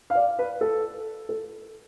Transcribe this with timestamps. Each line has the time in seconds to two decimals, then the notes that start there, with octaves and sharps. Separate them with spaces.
0.10 F5
0.15 D5
0.39 B4
0.61 A4
1.29 A4